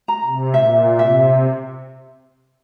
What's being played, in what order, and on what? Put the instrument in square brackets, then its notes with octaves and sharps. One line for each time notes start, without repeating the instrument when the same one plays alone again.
[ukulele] A#5
[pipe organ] C3
[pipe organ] A#2 [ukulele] E5
[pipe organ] C3 [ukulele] E5